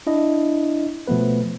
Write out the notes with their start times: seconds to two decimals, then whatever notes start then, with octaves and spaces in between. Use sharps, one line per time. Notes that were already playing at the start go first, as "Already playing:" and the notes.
0.07 D4 E4 D#5
1.07 B2 F3 A3 B3 B4